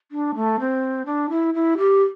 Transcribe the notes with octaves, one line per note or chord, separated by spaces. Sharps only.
D4
A3
C4
D4
E4
E4
G4